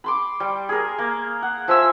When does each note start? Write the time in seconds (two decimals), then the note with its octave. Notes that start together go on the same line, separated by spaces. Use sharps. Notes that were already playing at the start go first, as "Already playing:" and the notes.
0.04 B5 C6 D6
0.40 G3
0.69 G#4 A#4
0.98 A#3
1.42 F#5
1.68 F3 E5 G#5 E6